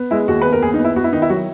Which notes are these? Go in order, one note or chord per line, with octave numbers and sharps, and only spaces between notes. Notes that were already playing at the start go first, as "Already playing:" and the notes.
Already playing: B3
G#3 E4
D#2 F#4
B3 B4
A#4
D#2 G#4
D#4
B3
E4
B3 F#4
E4
D#3 D#4
E4
F#3 F#4